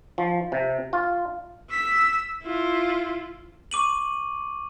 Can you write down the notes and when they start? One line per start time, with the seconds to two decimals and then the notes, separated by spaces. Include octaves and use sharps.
0.18 F3
0.52 C3
0.93 F4
1.71 E6 B6
2.43 E4 F4
3.71 C#6 D6 D#7 F#7